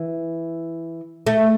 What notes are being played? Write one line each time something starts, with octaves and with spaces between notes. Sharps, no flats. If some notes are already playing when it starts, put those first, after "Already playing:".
Already playing: E3
A3